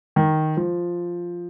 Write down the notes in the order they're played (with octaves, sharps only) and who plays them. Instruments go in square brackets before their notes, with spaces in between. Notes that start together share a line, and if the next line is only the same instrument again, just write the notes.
[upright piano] D#3
F3